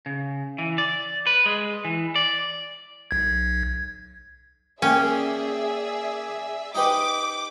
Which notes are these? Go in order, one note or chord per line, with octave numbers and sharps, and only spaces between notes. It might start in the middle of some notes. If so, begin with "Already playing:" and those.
C#3
E3
D5
B4
G#3
E3
D5
B1 G#6
A#3 C#4 G#4 D5 E5 G5
D#4 G4 B4 D6